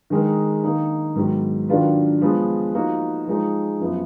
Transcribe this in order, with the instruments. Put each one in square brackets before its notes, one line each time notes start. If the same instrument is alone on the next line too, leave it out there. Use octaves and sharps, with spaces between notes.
[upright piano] D#3 G#3 D#4 A#4
D#3 A#3 D#4
G#2 D#3 F#3 B3
D#3 F#3 D4 F4 B4
F3 G#3 B3
F3 A#3 D#4 F#4
F3 G#3 D#4
F#2 F3 B3